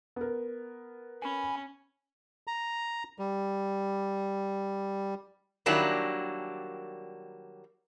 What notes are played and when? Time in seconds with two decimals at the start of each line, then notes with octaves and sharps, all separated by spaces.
0.16 B3 A#4
1.22 C#4 G#5 B5
2.47 A#5
3.19 G3
5.66 D#3 F#3 G3 A#3 D4 E4